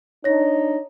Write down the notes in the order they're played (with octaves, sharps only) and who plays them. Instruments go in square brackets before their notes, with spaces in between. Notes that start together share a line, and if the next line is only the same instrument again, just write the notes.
[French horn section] D4 D#4 [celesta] C#5 A#6